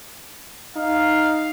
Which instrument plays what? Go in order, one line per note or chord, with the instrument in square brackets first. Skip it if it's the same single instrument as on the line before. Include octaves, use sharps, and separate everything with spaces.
[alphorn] D#4 [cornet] F5